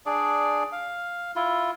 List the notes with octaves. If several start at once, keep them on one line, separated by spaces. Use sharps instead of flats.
D4 G#4 D5
F5
E4 F4